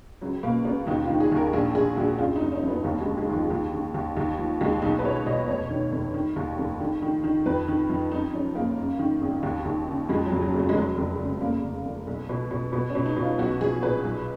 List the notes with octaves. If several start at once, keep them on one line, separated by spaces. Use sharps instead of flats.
C#2 F#3
B2 A#3
C#2 B3
D#2 D#4
F4
D#3
G#4
D#2 A#4
A#1 G#4
A#1 G#4
A#1 F#4
F#1 F4
D#4
F#1
C#4
F2
B3
D#2 A#3
G#3
D#3
G#3
D#2 F3
D#2
D#3
D#2
D#2
F3
D#2 G#3
B1 D#4
B4
B2 C#5
B2 D#5
F1 C#5
D#3
F1
D#3
D#2
F1
D#3
D#3
D#3
F2 B4
D#3
F2
F#2 D#4
F3 C#4
F#1 A#3
F#2
D#3
G#1
D#2
D#2
C#3
F2 G#3
F#3
F2
F#3
F#1
F#3
G#3
F1 F#3
F1
C#3
F1 A#3
F1
F1
B1
B2
B2
B2 B3
C#4
B2
D#4
B2
F4
B1 F#4
F3 G#4
A#2 B4
B1